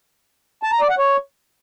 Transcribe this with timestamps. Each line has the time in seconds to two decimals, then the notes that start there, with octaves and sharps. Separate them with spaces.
0.63 A5
0.72 A#5
0.81 D5
0.90 F#5
0.98 C#5